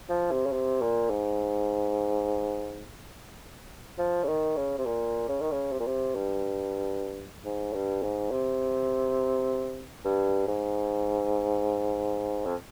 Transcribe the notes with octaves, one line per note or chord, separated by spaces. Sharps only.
F3
C3
C#3
C3
A#2
G#2
F3
C#3
D#3
C#3
C3
A#2
C#3
D#3
C#3
C3
A#2
C3
G2
G#2
G2
G#2
C3
G2
G#2
F2